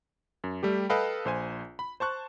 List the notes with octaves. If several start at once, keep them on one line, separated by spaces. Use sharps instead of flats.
F#2
G3 A3 G4
A4 B4 D#5 F5 G5 B5
A#1 C5 G#5
B5
C5 A5 C#6 F#6